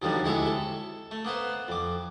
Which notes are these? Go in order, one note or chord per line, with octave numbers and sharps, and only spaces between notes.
D#2 B2 D3 F3 G3
D2 C3 G#3 E4 C#5 E5
A4
A3
A#3 B3 B4 C5
F2 D6